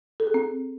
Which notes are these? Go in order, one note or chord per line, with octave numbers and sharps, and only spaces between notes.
A4
G#4
C4